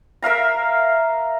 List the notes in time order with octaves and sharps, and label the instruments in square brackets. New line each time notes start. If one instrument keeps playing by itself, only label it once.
[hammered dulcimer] A#4 E5 F5 A#5